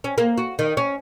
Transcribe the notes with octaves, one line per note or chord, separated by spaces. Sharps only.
C#4
A#3
F#4
D#3
C#4